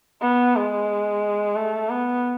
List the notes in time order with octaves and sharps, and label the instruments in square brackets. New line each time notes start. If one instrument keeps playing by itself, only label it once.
[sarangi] B3
G#3
A3
B3